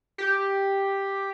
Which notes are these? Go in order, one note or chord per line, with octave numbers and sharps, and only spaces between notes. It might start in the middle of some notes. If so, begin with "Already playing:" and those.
G4